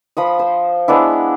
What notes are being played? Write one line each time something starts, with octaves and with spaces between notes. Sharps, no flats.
F3 B5 D#6
C5
G#3 B3 D4 E4